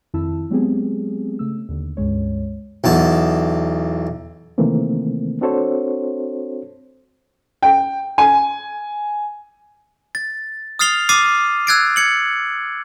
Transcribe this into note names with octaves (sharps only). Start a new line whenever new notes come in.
F2 D#3 E4 A5 E6
F#3 G#3 B3 C4 G4 G#4
C#3 A3 E6
D#2 D3
C#2 G2 G#3 C#5
B1 E2 A5
C3 D#3 E3 A3 A#3 C4
C4 D4 F#4 A4 C5 C#5
G5
G#5
A6
D#6 F6 A6 C7 F7 G7
D6 D#6 F6 A6 C7 D#7
E6 F#6 G#6 A6 C7 D7
G#6 C#7 F#7